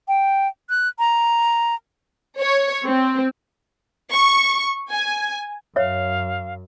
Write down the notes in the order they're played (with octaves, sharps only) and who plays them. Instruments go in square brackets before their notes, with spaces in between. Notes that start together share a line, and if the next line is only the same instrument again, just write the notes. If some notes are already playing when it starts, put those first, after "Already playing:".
[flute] G5
F#6
A#5
[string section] C#5
C4
[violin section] C#6
G#5
[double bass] F#2 [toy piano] C#5 E5 [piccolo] F5